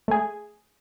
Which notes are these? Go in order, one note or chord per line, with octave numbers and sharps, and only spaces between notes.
A3 G#4